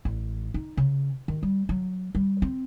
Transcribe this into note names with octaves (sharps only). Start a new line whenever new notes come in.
A1
D#4
C#3
D#3
G3
F#3
G3
C4